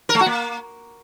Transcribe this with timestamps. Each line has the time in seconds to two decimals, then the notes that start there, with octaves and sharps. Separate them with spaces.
0.09 A#4
0.15 A3
0.21 F#4
0.26 A#3